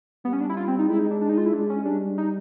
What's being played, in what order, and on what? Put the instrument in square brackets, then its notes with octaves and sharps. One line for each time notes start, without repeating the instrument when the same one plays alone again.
[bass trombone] G3 [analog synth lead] B3
[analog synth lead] C#4
D4
E4
F4
C4
D#4
[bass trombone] G#3 [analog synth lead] E4
[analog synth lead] D#4
D4
D4
D#4
F4
E4
[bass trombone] G#3 [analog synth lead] D4
[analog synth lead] C#4
[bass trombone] G3 [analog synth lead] D4
[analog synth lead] D#4